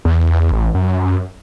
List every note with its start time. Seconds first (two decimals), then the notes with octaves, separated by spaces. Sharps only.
0.05 E2
0.52 A1
0.75 F#2